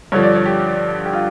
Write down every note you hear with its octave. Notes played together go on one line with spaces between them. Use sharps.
G2 D3 F3 C#5
D5
C#5
G4
G4
F4